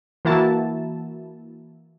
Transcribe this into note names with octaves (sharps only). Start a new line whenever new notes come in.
E3 A#3 E4 F#4 A5